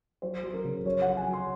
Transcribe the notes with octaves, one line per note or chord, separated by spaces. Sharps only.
F#3 C5
F#3
A#4
C#3
F#3 C#5
F#5
F#3
G#5
F#3
C6